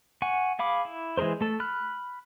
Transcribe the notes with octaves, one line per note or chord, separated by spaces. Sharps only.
F#5 G#5 C#6
G#4 F5 B5 D6
E4
E3 G#3 G#4 A#4 C5
A3 A4
B5 F6 F#6